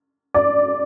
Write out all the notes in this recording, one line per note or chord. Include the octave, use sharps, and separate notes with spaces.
D5